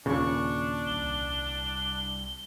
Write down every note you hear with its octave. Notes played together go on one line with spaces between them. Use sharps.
D#2 A#2 C#3 D4 C#6
C2 G7